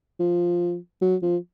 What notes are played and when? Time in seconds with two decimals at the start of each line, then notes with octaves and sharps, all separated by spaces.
0.20 F3
1.02 F#3
1.22 F3